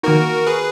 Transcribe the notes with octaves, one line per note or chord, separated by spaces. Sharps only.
D#3 A#3 D#4 F#4 A#4
G#4 B4